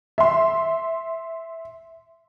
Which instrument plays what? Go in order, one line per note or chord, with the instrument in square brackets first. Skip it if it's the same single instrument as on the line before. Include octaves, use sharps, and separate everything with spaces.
[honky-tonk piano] E5 C6